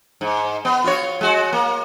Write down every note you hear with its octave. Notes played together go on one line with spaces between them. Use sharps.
G#2
B3
F4 F#4 C#5
G#3 F#4
A#3